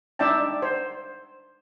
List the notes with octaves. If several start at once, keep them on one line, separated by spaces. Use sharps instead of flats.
D4 D#4 D5 E5 G5 A5
C5